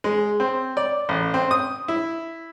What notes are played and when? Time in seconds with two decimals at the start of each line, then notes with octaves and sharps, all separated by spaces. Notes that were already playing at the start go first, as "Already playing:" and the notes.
0.04 G#3
0.40 C4
0.77 D5
1.09 A1
1.34 C4
1.51 D#6
1.88 E4